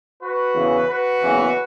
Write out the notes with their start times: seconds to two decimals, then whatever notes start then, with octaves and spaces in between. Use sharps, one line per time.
0.21 F#4 B4
0.55 E2 C#3 E3
0.88 F#4 B4
1.22 F#1 E2 C#3 E3